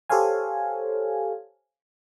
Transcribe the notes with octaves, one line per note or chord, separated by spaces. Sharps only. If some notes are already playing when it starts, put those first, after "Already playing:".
G4 A4 C5 C#5 F5 G#5